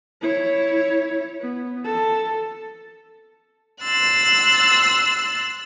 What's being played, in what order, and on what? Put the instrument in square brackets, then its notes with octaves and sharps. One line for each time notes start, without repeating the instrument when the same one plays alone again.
[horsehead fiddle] E4 C#5
B3
A4
[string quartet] C6 E6 F#6 A6